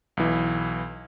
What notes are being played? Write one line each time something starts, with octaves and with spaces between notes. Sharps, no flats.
B1 E3